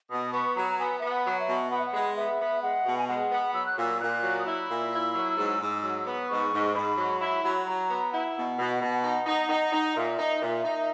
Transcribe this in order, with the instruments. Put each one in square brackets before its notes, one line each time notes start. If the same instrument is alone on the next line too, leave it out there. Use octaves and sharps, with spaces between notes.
[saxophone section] B2 [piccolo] D#6
[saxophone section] B3 [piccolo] C#6
[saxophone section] F#3 [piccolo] A#5
[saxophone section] B3 [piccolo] G#5
[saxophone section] B3 [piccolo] E5
[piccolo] F#5
[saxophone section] F#3
[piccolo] E5
[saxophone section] B2
[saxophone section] B3 [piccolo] F#5
[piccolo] E5
F#5
[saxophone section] G#3
[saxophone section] B3 [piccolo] E5
[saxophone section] B3
[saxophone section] G#3 [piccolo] F#5
[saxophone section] B2
[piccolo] G#5
[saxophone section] G#3 [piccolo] F#5
[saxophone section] B3
[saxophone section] F#3 [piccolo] E6
[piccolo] F#6
[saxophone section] A#2 [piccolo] E6
[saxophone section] A#2 [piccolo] F#6
[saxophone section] F#3
[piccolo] D#6
[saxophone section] E4 [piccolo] E6
[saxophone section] A#2
E4
F#3
G#2
G#2
F#3
B3
[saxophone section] G#2 [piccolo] C#6
[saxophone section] G#2
[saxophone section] G#2 [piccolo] B5
[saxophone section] F#3
[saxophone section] E4 [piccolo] B5
[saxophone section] F#3
[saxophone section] F#3 [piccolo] A#5
[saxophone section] B3
[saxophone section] E4 [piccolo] F#5
[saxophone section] B2
B2
B2
D#4
D#4
D#4
D#4
[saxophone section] A#2 [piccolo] E5
[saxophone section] D#4
A#2
D#4